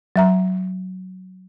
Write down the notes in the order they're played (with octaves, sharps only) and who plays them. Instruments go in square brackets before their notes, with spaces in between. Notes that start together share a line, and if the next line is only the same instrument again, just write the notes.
[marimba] F#3 E5 A#5